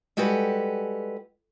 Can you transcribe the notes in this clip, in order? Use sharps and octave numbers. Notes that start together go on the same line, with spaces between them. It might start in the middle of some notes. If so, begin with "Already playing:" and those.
G3 G#3 F#4 G4 A4 B4